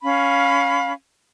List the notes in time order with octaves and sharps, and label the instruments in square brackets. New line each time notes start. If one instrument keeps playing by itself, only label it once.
[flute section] C#4 F5 B5